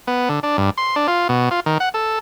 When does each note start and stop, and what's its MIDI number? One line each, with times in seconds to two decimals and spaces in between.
0.07 0.29 59
0.29 0.40 50
0.43 0.57 62
0.58 0.70 43
0.78 0.96 84
0.96 1.07 62
1.08 1.28 65
1.29 1.49 47
1.51 1.60 65
1.66 1.78 51
1.80 1.89 78
1.94 2.19 69